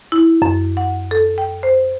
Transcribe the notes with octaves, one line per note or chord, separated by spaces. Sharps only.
E4
F#2
F#5
A4
G5
C5